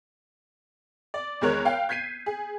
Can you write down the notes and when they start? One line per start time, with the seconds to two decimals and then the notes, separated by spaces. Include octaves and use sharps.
1.14 D5
1.41 E2 D#3 G#3 A#4 C#5 F#6
1.65 F5 G5
1.89 G6 G#6 B6 C7 D#7
2.26 G#4